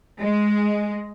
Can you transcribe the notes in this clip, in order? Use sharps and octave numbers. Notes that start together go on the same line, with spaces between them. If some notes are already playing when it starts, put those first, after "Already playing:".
G#3